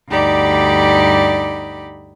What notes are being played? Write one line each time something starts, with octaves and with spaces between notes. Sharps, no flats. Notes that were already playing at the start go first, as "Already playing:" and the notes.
D2 G2 D#4 G4 D5 B5